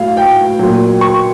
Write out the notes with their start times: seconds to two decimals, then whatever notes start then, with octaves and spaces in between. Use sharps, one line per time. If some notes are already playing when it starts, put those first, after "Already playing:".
Already playing: A2 F#3 F5
0.17 G5
0.59 A#2 F#3
1.01 C#6